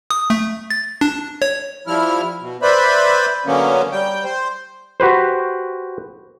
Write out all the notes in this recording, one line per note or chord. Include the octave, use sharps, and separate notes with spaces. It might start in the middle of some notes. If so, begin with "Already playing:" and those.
D#6
A3
A6
D4
C#5
F3 G3 E4 F6
B2
B4 C5 D5 E5 B5
D3 F#3 A#3 B3 C#4
G3 G5
C5
F#4 G4 B4 C5